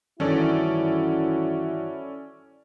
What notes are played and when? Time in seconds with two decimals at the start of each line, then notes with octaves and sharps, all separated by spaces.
0.20 G2 D#3 E3 C#4 E4 F#4 A4 D5